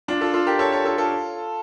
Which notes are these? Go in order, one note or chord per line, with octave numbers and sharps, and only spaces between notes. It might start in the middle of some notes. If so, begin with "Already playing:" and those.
D4 F4
F4 A4
F4 A4
G4 A#4
A4 C#5
A4 C#5
F4 A4
F4 A4